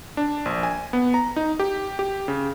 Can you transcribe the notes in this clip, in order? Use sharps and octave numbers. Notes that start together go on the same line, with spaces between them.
D4
A#1
G#5
B3
A#5
D#4
G4
G4
C#3